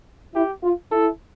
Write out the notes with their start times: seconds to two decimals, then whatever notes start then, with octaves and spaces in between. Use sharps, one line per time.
0.35 E4 G4
0.63 F4
0.91 E4 A4